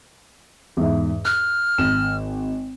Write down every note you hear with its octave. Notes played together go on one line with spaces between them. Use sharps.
E2 G#2 E5
F6 F#6
G#1 E7